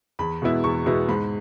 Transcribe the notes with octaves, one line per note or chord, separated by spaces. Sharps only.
E2 B5
B2 G#3 B3 E4
E2 C#6
B2 G#3 B3 E4
G#2 B5